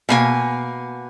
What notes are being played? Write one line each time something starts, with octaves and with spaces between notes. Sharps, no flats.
B2 A#3 G#5